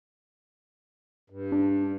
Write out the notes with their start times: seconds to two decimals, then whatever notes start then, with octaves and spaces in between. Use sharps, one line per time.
1.30 G2
1.52 D4